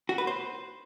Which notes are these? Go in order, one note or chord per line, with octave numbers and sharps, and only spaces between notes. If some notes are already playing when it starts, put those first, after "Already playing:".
F#4
B4
C5